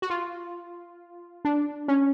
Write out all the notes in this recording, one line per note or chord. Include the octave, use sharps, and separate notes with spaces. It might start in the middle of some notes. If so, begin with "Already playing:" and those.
F#4
F4
D4
C#4